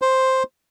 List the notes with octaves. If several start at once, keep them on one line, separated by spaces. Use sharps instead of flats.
C5